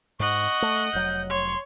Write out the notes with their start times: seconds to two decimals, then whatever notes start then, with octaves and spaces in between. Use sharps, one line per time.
0.20 G#2 D#5 F#5 C#6
0.62 A3
0.93 F1 F#3 G6
1.30 C#5 C6